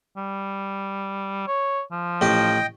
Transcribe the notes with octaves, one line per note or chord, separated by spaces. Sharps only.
G3
C#5
F3
A1 G4 D#5 G5